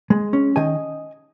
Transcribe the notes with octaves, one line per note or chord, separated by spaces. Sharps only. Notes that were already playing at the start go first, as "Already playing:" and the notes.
G#3
C#4
D#3 D#5 G#5